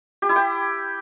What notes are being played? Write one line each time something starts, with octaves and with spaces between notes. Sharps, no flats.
G4
E4
G5